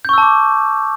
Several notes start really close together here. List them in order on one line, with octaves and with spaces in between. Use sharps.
G6 C#6 E6 A5 D6